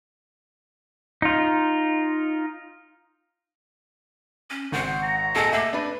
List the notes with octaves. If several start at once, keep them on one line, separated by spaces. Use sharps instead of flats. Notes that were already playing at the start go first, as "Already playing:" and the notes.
D#4 F4
C#4
G#1 C5 F#5
A#5
A#2 G#4 A4 D#5 F#5 G#5
A3 A#3 E5 D6
D4 B4